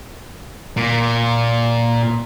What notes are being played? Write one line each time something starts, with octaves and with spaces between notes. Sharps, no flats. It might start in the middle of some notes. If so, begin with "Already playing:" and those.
A#2